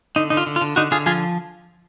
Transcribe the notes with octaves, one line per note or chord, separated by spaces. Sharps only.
D3 D#4
D3 D#4
F4
D3
F4
D3
D3 D#4 F#4
D3 F4 G#4
F3 F4 G#4